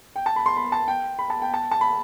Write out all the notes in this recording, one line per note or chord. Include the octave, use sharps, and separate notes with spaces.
G5
A5
B5
C6
B5
A5
G5
B5
A5
G5
A5
A5
B5